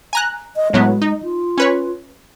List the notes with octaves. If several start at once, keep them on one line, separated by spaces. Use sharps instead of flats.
G#5 A#5 F#6
D#5
A2 F#3 G#3 B3
D#4
F4
C#4 B4 C#5